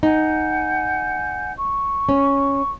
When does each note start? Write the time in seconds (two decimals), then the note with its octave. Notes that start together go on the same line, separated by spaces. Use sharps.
0.03 D#4 F#5 G#5 G6
1.58 C#6
2.09 C#4